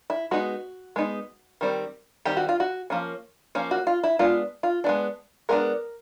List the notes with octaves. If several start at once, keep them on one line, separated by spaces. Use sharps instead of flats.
E4
G#3 B3 D#4 F#4
G#3 B3 D#4
D#3 G3 C4
D#3 G3 C4 G4
F#4
F4
F#4
F3 A#3 C#4
F3 A#3 C#4
F#4
F4
E4
G#3 B3 D4 F4
F4
G#3 B3 D4
G#3 B3 D4 A#4